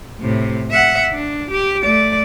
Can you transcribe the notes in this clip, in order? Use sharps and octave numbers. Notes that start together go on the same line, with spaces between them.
A2 C3
E5 F#5
D4
G4
A3 D5